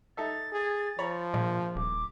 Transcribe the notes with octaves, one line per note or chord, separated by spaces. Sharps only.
D#4 A4 E5 A6
G#4
F3 C#5 A#5 B5
A#1 A#2
D#1 D6